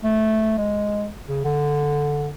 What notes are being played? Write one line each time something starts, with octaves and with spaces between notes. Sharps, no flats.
A3
G#3
C#3
D3